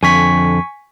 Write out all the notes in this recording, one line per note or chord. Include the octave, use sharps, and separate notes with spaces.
F2 D3 G#5 C#6 B6